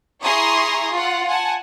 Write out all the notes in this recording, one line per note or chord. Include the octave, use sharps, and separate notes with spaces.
E4 G#4 A#5 C6 C#6 D#6
F4 F#5
F#5 G#5 A5